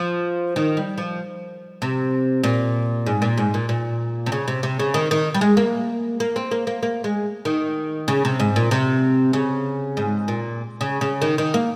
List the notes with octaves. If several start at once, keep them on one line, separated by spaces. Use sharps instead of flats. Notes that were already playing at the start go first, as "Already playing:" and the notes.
Already playing: F3
D#3
G3
F3
C3
A#2
G#2
A#2
G#2
A#2
A#2
C3
C#3
C3
C3
C#3
D#3
D#3
G3
G#3
A#3
A#3
C4
A#3
A#3
A#3
G#3
D#3
C#3
C3
G#2
A#2
C3
C#3
G#2
A#2
C#3
C#3
D#3
D#3
A#3